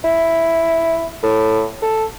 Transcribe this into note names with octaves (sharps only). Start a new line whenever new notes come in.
E4
A2
A4